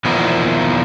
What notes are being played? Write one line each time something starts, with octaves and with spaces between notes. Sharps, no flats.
E2 B2 D#3 F3 A#3 E4